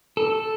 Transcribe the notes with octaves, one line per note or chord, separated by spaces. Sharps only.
A4